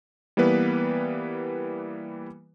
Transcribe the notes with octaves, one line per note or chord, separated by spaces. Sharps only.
E3 G3 A#3 B3 B4